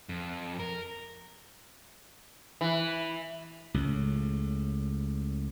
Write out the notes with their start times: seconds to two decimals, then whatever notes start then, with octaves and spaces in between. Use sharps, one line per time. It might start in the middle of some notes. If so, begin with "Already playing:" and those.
0.09 F2
0.60 A#4
2.61 E3
3.74 C#2 A2